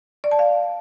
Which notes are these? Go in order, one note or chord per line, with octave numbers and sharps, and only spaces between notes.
D5
A5
F5